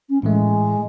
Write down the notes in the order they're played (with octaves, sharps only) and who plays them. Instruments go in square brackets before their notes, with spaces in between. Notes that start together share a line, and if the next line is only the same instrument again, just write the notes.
[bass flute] C#4
[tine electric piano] A2 E3 A3 [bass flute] G#3